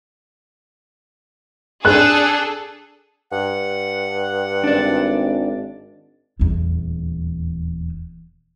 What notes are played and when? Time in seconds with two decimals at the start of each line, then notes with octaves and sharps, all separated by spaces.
1.85 D4 G#4 A4 F#6
3.32 G2 F#5
4.64 G#1 D4 D5
6.40 D#1 E2